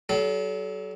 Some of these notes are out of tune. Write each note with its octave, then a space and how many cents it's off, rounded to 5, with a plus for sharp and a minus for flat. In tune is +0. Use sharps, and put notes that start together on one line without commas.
F#3 +40 A4 -35